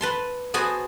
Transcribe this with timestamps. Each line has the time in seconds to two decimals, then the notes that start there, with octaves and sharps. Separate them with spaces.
0.01 B4 A5 C6
0.54 B3 F#4 G#4 C5 G#5 A5